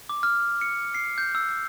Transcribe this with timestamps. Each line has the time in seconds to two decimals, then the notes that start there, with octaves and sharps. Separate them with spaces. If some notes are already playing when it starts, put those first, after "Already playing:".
0.09 D6
0.23 F6
0.61 C#7
0.94 C7
1.18 G6
1.35 E6